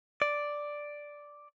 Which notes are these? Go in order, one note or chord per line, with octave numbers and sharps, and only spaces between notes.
D5